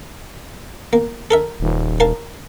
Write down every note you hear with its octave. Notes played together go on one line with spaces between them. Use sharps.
A#3
A4 A#4 E5
D#1
A#4 F5 A5